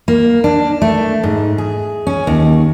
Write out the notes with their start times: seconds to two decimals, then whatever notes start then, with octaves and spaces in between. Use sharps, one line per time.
0.08 A#3
0.44 D4
0.82 A3
1.23 G#2
1.58 G#4
2.07 C#4
2.27 D#2